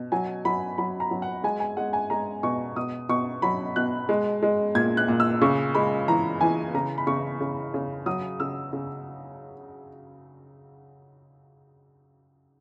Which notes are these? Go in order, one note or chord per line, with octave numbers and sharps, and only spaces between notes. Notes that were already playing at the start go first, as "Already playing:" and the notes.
Already playing: B2
F#3 G#5
F#3 B5
F#3 B5
A#5
F#3
F#5
G#3 G#5
G#5
G#3 F#5
G#5
G#3 A#5
B2 C#6
B2 D#6
B2 C#6
F#3 B5
B2 F#6
G#3
G#3
A#2 G#6
F#6
A#2
E6
C#3 C#6
G#3 B5
E3 A#5
E3 G#5
C#3 A#5
B5
C#3 C#6
C#3
C#3
F#3 D#6
C#3 E6
C#3